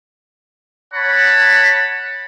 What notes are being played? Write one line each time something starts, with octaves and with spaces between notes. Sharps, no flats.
C#5 F#5 A5 B5